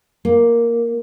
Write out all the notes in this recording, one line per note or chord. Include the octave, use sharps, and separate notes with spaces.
A#3